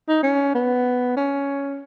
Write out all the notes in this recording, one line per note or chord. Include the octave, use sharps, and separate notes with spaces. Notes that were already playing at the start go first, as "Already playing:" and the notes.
D#4
C#4
B3
C#4